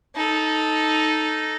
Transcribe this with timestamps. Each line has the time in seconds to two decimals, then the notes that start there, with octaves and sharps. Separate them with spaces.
0.16 D#4 A4